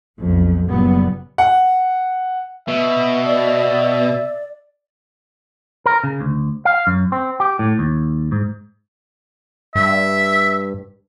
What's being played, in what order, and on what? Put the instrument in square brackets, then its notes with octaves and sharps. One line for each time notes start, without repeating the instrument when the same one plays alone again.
[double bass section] B1 F2
F#1 F#2 A#2 G3 B3
[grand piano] F#5
[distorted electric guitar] B2 [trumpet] E5
[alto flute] D5
[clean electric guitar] A#4
C#3
D2
F5
F#2
C4
G4
A2
D#2
G#2
[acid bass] G2 [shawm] E5